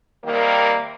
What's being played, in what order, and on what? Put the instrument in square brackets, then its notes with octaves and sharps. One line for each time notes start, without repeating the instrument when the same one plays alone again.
[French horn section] C3 D#3 G3 A#3